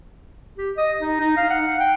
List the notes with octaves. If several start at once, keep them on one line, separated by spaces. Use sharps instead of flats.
G4
D#5
D#4
D#4
F5
F#5
G5